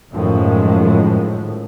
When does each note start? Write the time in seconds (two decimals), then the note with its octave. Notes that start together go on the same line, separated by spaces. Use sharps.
0.12 F#2 A2 D#3 F3 G#3